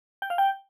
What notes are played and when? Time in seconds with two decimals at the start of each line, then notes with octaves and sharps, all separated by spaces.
0.22 G5
0.30 F5
0.38 G5